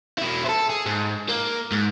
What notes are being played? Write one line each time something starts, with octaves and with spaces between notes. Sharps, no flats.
B2 E4
A4 C5
G#4
G#2
A#3
G#2